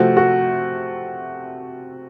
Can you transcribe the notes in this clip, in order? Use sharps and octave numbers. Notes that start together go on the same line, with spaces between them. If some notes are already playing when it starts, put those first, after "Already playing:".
Already playing: C3 F3 A3 C4 F#4
F#4